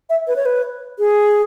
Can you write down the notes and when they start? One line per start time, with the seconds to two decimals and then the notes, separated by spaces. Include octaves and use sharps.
0.10 E5
0.27 B4
0.36 C#5
0.45 B4
0.99 G#4